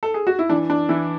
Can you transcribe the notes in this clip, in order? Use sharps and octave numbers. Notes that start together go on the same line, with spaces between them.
A4
G#4
F#4
E4
E3 D4
D4
E3 E4